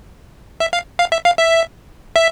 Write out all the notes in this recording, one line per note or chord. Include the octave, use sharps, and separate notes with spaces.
E5
F5
F5
E5
F5
E5
E5